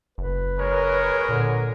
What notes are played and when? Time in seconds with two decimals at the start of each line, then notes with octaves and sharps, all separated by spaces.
0.18 F#1 B4
0.59 G#3 A#4 C#5
1.29 A#2 D3